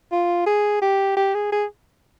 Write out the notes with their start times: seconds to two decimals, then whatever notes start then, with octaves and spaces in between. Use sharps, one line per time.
0.12 F4
0.46 G#4
0.82 G4
1.17 G4
1.34 G#4
1.52 G#4